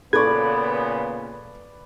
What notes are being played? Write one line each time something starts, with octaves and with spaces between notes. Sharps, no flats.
A#2 C#3 B3 A4 B4 D5 C#6 G#6